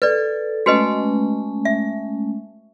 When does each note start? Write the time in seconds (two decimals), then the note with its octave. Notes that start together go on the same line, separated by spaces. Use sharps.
0.02 A4 B4 D5
0.66 G#3 A3 C#4 F#4 B4 D#5
1.65 E5